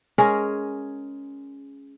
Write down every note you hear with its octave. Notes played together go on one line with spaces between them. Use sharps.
G#3 C#4 G#4 A#4